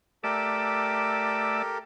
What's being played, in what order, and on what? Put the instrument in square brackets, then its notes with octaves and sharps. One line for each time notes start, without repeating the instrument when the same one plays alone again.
[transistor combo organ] A3 D5 E5 [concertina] G4 A4 A#4